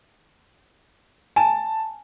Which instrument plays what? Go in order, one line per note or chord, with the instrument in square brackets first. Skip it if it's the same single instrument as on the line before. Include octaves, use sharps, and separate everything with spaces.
[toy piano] G#5 [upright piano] A5